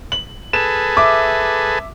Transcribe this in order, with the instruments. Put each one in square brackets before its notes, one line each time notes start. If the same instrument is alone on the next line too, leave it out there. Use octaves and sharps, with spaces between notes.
[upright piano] F#7
[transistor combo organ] G#4 A4 B4 [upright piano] E7
[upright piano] E5 D6